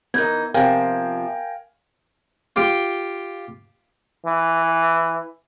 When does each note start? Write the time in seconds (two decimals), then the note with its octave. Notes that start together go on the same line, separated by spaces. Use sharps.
0.14 E3 B3 D#4 A#4 G6 G#6
0.54 C3 F3 A#4 F5 G5 G#5
2.56 F4 G4 G5
4.26 E3